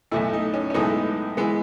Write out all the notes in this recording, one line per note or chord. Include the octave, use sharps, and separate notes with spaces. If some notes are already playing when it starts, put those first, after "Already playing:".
B1 A2 E3 A3 E4
D#4
C#4
C#4
B1 A2 E3 G#3 B3 D#4
E3 G#3 B3